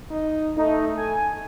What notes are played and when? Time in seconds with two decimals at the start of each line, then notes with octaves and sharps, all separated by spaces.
0.10 D#4
0.57 A3 D#4
0.97 A4 G#5